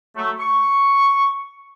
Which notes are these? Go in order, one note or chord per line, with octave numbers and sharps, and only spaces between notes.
F#3 A3
C#6